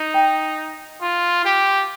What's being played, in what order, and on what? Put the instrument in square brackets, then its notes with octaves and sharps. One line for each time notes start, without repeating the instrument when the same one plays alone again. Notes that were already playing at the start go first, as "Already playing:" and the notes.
Already playing: [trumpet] D#4
[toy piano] G5
[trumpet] F4
G4